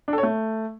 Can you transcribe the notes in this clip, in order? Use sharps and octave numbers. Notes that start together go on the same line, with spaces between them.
D4
A4
C#5
A3